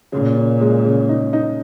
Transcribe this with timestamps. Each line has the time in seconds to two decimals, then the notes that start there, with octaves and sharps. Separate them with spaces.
0.12 A#2 C#3
0.37 C#3
0.61 G#3
0.85 C#3
1.09 D#4
1.33 D#4